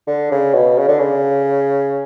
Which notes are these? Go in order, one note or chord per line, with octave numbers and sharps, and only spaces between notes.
D3
C#3
B2
C#3
D3
C#3